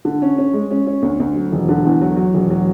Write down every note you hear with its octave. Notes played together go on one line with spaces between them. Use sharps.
D3
C#4
C#4
G#3
C#4
C#4
D2
D2
F#3
E1
D3
E2
F#3
F#3
E1
F#3